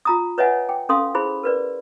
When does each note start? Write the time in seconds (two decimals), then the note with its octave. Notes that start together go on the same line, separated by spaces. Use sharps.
0.05 F4 A#5 D#6
0.38 B4 C#5 D#5 E5 F#5 G#5
0.69 G5
0.89 C#4 A4 F5 C6 D#6
1.15 E4 G#4 C5 B5
1.44 A#4 B4 D5